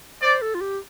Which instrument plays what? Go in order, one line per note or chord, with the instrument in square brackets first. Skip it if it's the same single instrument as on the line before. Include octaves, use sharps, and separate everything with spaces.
[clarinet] C5 [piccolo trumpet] D5
[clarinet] A4
F4
G4